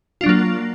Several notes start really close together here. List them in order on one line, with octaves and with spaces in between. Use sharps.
F4 D4 F#3 A#3